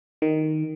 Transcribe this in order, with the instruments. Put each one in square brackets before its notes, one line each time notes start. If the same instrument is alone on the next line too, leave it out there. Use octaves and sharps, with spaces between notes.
[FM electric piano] D#3